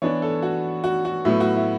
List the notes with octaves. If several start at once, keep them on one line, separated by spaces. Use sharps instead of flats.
E3 B3 D4 C#5
A4
F#4
F#4
F#4
A2 F#3 B3 E4
F#4
E4